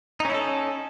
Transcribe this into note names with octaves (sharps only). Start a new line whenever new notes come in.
C#4 D#4 E4 A4